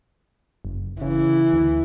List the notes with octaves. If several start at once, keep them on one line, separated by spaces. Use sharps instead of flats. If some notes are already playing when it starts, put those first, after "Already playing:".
F#1
C#3 E3
D2